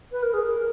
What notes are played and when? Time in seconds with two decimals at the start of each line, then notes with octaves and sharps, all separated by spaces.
0.11 B4
0.22 A#4
0.33 G#4
0.43 A#4